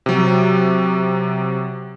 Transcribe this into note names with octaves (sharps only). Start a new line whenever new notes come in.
C3 F#3